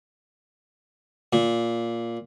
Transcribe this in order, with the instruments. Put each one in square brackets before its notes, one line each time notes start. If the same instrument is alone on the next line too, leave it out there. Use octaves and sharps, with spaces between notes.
[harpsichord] A#2